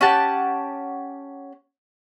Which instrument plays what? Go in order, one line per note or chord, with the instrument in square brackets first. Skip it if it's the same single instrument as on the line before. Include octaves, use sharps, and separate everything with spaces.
[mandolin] C#4 G4 F#5 A5